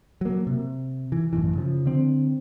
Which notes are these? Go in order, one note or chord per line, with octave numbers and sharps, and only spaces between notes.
F#3 A#3
C3
E3
A1 F#2 B2 E3
C#3 F3
D3 C4